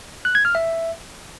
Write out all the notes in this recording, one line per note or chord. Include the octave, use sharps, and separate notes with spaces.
F#6
G#6
F6
E5